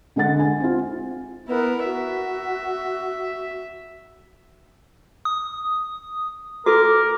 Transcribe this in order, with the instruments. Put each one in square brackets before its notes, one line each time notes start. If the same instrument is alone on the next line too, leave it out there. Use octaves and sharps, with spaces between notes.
[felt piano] D3 G#3 A4 F#5 A6
G#5
C4 F4
[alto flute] B3 [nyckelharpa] E4 A#4
[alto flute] F#4 [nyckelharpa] E5
[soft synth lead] D#6
[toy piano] F#4 A4 [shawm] A#4 [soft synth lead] D6